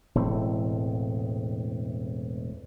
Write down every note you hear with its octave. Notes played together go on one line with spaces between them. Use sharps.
E1 A2 A3 C4